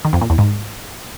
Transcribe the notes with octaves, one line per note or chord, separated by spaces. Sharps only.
D#3
F2
A#2
E2
G#2